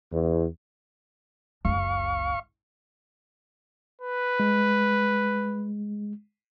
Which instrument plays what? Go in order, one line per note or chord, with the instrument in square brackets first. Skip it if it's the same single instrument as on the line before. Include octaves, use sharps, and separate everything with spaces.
[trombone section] E2
[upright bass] F#1 C#2 [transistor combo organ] F5 C#6
[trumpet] B4
[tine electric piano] G#3